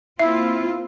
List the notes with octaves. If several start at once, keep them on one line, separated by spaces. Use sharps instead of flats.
A#3 C4 E4 F4 E5